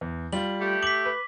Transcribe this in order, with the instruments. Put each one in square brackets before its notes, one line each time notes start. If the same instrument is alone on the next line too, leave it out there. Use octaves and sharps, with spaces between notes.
[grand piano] E2
[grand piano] G3 F4 [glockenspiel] F#7
[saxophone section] A3 G4
[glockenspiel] D6 B6 [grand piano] F#7
[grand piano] B4